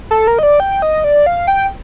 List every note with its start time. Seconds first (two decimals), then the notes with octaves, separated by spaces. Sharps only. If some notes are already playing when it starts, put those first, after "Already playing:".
0.11 A4
0.27 A#4
0.39 D#5
0.43 D5
0.60 G5
0.82 D#5
1.04 D5
1.26 F5
1.47 G5